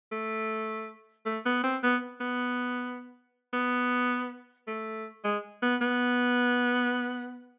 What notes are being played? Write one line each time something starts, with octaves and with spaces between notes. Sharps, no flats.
A3
A3
B3
C4
B3
B3
B3
A3
G#3
B3
B3